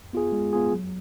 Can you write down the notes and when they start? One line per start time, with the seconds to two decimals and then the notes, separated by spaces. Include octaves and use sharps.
0.13 B3 F4 G#4
0.32 G#3
0.53 B3 F4 G#4
0.73 F#3